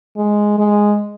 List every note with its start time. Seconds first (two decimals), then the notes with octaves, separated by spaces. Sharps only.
0.17 G#3
0.58 G#3